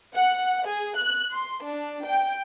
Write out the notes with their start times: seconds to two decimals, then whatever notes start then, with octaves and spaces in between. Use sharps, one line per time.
0.16 F#5
0.66 G#4
0.97 F#6
1.33 C6
1.65 D4
2.06 G5